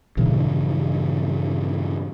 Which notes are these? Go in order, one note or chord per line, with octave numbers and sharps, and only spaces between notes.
G2 A#2 C#3 E3